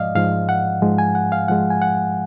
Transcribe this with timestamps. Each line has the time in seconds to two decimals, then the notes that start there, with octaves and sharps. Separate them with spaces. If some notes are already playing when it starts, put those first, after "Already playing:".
Already playing: G#2 F3 G#3 D5 D#5 F5
0.15 G#2 F3 G#3 F5
0.49 F#5
0.82 G#2 F3 G#3
0.98 G#5
1.15 F#5
1.32 F5
1.48 G#2 F3 G#3 F#5
1.70 G#5
1.82 F#5